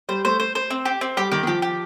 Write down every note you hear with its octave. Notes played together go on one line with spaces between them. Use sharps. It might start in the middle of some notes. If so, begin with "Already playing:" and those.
G3 C5
A3 C5
C5
C5
C4
G4
C4
G3 G4
D#3 G4
D#3
F3 G4
G4